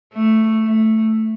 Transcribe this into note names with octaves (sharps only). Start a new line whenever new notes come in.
A3
A3